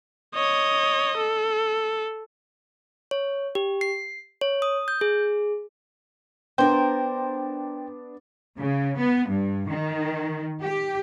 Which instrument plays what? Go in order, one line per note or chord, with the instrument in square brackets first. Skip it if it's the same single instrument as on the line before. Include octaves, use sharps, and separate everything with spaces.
[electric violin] C#5 D#5
A4
[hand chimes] C#5
G4
C7
C#5
D#6
G6
G#4
[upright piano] B3 D4 [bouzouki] A#4 C5 [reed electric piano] G5
[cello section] C#3
B3
G2
D#3
G4